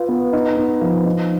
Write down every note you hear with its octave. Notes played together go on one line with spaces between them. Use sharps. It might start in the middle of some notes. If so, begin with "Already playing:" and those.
Already playing: F4 B4
B3
D#4
B3
F3
D#4